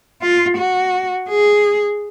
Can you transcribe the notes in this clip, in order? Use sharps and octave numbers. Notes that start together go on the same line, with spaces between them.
F4
F#4
G#4